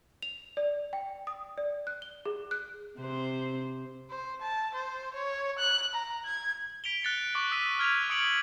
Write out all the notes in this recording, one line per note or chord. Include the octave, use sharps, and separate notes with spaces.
F7
D5
G5
D#6
D5
F#6
G7
G#4
F#6
C3 C4 C5
C5
A5
C5
C#5
F#6
A#5
G#6
B6 D7 F7 G7
F#6 A6 C#7 G7
C#6 D6 B6 C#7 F#7
D#6 E6 F#6 B6 D#7
F6 G#6 B6 F7
C#6 D#6 C#7 D7 F7 F#7